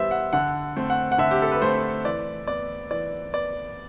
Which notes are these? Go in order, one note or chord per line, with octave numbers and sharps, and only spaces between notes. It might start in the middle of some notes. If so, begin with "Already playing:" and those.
Already playing: E3 G3 B3 C5 E5
F#5
D3 F#5
A3 C4
F#5
F#5
D3 E5
G4
A4
B4
A3 C4 C5
E3 D5
B3 D5
E3 D5
B3 D5